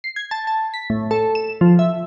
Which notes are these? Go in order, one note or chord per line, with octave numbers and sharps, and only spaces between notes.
C7
G#6
A5
A5
B6
A2
A4
E7
F3
E5